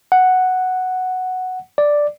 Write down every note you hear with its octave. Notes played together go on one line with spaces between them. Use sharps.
F#5
D5